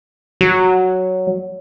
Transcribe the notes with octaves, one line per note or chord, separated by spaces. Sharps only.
F#3